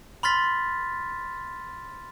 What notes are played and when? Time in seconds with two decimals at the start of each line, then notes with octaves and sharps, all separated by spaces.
0.23 B5 C6 F6 A6 B6